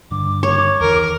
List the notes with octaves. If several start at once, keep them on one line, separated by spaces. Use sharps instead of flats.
G2 D3 D6
C#5
E2 D#3 A#4